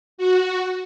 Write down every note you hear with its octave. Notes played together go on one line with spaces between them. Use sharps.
F#4